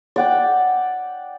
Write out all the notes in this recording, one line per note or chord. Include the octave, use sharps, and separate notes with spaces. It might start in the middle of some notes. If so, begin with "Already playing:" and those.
D5 F#5 G5